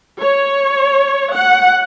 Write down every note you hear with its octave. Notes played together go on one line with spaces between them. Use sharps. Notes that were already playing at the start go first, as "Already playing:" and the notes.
C#5
F#5